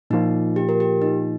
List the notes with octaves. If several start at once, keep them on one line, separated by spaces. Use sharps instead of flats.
A#2 F3 A#3 D#4 F4
G4
A#4
G4
D#4